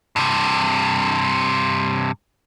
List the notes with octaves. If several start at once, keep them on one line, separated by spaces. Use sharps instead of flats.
G2 C3